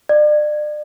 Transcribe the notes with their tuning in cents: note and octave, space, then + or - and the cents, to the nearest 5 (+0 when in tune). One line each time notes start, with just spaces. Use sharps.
D5 +35